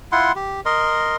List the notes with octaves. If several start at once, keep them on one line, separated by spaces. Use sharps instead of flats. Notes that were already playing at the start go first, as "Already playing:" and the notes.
E4 F4 F#5 C6
G4
A#4 D#5 C6